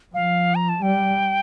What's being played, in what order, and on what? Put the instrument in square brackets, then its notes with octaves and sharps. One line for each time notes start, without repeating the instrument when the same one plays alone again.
[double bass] F3 [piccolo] F5
[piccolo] A#5
A5
[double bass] G3 [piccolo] G5